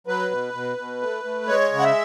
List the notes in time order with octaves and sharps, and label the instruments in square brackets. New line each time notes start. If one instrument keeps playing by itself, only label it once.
[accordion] F#3 B4
B2
B2
B2
A3
A3
G#3 C#5
C#3
F#5
E5